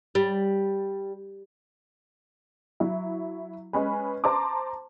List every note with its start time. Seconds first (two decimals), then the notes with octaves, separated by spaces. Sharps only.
0.15 G3
2.80 F#3 E4
3.73 G#3 C#4 B4
4.24 C5 A5 A#5 C6 D6